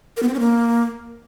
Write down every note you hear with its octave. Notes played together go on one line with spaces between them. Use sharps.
A#4
B3
C4
C#4
A#3